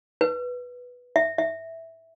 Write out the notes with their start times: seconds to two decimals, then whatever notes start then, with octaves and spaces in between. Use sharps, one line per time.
0.21 B4
1.16 E5
1.38 E5